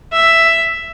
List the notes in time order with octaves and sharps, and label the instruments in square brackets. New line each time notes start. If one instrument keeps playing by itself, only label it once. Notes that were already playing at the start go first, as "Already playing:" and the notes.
[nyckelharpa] E5